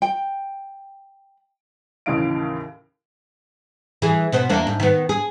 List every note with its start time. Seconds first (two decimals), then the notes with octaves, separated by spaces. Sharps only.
0.02 G5
2.06 D#2 A2 C#3 E3 F5 D7
4.02 E3 G#4
4.32 B2 B3 C5
4.49 E2 A#3 D4
4.67 G#2
4.80 D#3 B3
5.09 G#4